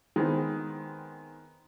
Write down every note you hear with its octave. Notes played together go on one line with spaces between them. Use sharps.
D#3 G#3 B3 C4